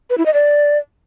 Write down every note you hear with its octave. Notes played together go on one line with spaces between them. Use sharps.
B4
E4
D#5
D5